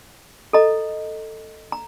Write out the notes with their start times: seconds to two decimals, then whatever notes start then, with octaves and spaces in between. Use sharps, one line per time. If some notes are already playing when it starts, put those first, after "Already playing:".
0.53 A4 D#5 A#5
1.72 A#5